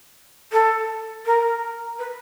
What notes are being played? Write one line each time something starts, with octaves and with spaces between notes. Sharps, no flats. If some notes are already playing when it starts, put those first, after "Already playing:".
A4
A#4
B4